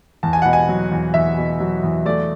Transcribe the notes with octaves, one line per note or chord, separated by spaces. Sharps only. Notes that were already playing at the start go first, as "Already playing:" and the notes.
E2 A5
G#5
B2 F#5
G#5
F#3
E2
E2 E5
B2
F#3
E2
A3 D5